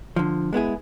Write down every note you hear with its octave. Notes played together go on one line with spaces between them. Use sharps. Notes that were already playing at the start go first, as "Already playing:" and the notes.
D3 F3
G#3 B3 E4 G#4